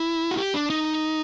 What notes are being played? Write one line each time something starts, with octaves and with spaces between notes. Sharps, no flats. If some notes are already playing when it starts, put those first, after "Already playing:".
Already playing: E4
F#4
G4
D4
D#4